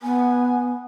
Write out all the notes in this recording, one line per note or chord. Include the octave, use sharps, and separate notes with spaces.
B3 G#5